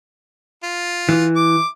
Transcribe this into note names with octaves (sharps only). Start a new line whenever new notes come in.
F4
E3
D6